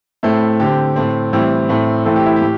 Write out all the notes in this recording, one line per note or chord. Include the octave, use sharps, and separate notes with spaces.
A2 A3 C4 E4
D3 C4 G4
A2 A3 C4
A2 E3 G3 C4 E4
A2 A3 C4
A2 E3 C4 A4
G4
E4
G4
A2